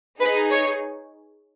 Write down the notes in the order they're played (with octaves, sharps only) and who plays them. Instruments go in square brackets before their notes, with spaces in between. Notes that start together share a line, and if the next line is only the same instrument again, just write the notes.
[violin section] D#4 G#4 B4
C#5